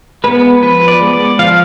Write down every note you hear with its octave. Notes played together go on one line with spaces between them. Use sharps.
G#3 B3 B4
F3 B4
D5
G#3 B3
D5
F3 F5